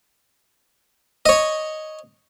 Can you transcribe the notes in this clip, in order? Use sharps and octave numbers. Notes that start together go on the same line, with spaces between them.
C#5 D#5